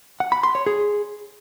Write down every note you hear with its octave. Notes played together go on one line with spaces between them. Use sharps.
F#5
B5
C6
C#5
G#4